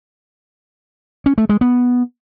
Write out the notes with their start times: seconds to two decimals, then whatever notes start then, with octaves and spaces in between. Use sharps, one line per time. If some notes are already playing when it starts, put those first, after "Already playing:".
1.26 C#4
1.38 A3
1.49 G#3
1.61 B3